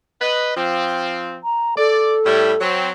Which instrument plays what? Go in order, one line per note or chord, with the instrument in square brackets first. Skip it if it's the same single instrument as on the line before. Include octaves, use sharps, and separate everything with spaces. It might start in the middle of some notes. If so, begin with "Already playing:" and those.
[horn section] B4 D#5
F3 C4
[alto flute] A#5
[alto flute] A4 [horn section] D5
[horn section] A2 G3 E4
F#3 C4